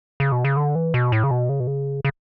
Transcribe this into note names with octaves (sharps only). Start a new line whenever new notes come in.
C#3
B2
C#3
D3
E3
B2
A2
C#3
B2
C#3
B2
C#3
C#3